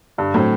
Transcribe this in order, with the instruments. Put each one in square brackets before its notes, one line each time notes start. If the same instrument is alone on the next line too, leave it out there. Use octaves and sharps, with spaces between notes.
[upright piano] G2 [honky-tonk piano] D3
[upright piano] A2 [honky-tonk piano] F#3 C4